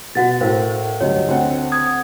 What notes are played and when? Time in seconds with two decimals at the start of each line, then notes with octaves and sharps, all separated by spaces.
0.15 B2 F#4 F#5 A6
0.41 A2 A3 A#4 C5 F5
1.01 D2 G2 F#3 C#5 D#5
1.28 D2 C4 F#5
1.72 D#6 G#6